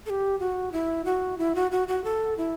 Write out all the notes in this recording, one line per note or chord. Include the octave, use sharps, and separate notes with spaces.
A4
G4
F#4
E4
F#4
E4
F#4
F#4
F#4
A4
E4